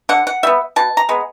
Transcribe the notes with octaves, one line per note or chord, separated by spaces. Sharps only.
D3 F#5
F#5
G3 B3 E5
B2 A5
A#5
G#3 B3